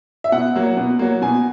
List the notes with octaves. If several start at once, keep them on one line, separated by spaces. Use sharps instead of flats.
E5
B2 F#5
F#3 A#3
B2
F#3 A#3
B2 G#5